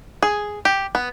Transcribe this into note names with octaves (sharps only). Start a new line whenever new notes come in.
G#4
G4
B3